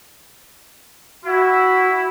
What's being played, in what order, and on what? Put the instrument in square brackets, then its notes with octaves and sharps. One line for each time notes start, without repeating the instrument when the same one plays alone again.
[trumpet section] E4 [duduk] F#4